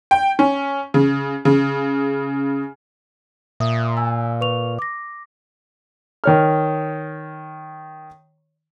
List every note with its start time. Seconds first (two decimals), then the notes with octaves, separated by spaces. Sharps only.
0.11 G5
0.39 C#4
0.94 C#3
1.45 C#3
3.60 A#2 E5 D#6
3.97 G#5 E6
4.41 B4 C#6 F7
4.79 D6 A#6
6.24 D#3 C#5 F6